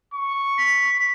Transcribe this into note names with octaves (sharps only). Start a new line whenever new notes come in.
C#6
B6